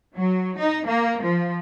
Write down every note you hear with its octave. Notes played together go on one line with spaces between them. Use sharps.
F#3
D#4
A#3
F3